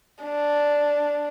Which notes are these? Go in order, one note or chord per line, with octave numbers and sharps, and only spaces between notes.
D4